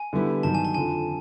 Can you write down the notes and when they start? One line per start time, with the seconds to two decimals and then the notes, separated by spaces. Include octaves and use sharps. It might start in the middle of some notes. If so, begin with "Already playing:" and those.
Already playing: G#5
0.13 D3 G3 B3 E4 G4
0.43 G2 D#3 F#3 A5
0.55 G#5
0.65 A5
0.74 F2 D3 F3 G#5